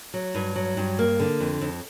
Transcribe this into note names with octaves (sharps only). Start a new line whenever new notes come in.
F#3
G2
F#3
G2
A#3
D3
F2
F2